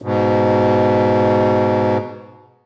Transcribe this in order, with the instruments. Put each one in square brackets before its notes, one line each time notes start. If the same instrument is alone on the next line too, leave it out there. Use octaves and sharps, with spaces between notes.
[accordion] G#2 B2